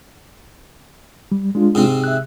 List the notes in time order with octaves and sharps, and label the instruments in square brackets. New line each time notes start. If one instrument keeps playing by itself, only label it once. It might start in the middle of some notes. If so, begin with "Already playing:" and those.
[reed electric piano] G3
G#3 D4 F4
[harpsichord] G#2 C3 C4
[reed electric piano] E5 F#6